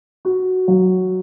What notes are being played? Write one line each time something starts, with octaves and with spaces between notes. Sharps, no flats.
F#4
F#3